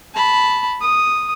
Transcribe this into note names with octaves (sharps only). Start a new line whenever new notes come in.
A5 B5
D#6